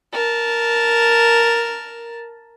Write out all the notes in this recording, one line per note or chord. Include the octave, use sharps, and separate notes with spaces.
A#4 A5